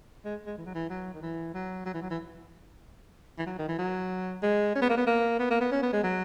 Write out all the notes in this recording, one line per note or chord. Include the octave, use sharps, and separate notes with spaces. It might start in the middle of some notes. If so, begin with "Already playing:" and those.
G#3
G#3
E3
F#3
E3
F#3
D#3
E3
F#3
F#3
E3
F#3
E3
E3
F#3
D#3
E3
F#3
G#3
C#4
B3
A#3
B3
A#3
B3
A#3
B3
C#4
B3
G#3
F#3